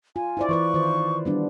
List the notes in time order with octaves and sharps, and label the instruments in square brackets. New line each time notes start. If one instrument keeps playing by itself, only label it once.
[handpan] F4 [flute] G#5
[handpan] E4 C5 D5
[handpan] E3 B4 D5 [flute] C#6
[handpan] D#3 F4 C5
G3 B3 D4